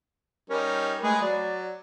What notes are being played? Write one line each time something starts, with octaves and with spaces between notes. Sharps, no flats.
G3 C#4 D#4 A#4
G#3 A3 G#4 B4
F#3 D5